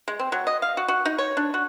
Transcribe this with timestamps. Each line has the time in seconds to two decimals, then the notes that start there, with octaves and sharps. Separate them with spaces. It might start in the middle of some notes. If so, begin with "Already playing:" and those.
0.08 G#3
0.19 C4
0.32 F#3
0.47 D#5
0.62 F5
0.77 F#4
0.88 F#4
1.05 D#4
1.18 C#5
1.37 D4
1.54 F#4